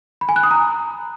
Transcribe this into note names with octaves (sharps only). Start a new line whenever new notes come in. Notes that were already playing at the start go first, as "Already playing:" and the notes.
B5
G#5
F#6
D#6
A#5